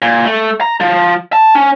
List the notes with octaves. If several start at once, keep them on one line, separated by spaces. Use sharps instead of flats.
A#2
A3
A#5
F3
A5
C#4